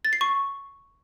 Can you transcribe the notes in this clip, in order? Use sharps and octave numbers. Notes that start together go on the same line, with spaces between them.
A6
C7
C#6